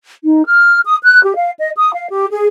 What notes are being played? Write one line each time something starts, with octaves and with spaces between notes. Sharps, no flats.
D#4
F6
D#6
F#6
G4
F5
D#5
D#6
F5
G4
G#4